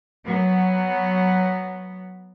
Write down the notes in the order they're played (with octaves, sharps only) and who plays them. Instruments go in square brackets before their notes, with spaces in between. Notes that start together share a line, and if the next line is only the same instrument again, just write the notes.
[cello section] F#3 B3